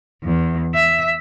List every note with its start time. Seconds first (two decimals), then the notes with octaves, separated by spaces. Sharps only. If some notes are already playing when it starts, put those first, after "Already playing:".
0.23 E2
0.75 E5